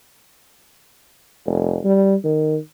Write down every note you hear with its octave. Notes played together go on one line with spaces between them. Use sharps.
F1
G3
D#3